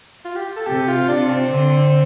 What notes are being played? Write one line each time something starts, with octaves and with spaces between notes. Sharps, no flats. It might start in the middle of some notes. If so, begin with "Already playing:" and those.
F4
G4
A4
C3 G4
F4
C3 D4
C4
D3